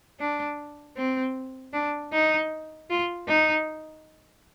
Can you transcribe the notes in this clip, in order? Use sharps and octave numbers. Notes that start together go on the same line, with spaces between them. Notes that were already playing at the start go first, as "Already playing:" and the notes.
D4
C4
D4
D#4
F4
D#4